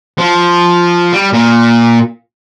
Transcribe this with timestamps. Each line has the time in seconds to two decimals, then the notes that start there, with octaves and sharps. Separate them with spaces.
0.18 F3
1.13 G3
1.34 A#2